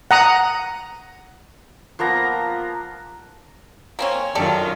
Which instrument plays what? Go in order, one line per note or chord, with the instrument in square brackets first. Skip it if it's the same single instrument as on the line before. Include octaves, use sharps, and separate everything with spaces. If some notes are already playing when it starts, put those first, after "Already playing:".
[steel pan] F#5 A#5 D#6
[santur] F3 A#3 B3 A#5
[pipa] A#3 C4 C#4
[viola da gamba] F#2 D#3 F4 [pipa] G4 A4 D5